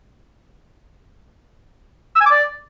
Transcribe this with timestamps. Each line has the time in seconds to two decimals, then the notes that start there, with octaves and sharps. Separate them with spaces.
2.16 E6
2.21 G#5
2.26 D6
2.31 D5